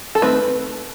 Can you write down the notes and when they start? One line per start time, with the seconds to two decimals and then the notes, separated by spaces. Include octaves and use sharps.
0.15 A4
0.22 D#3 A3 C4 B4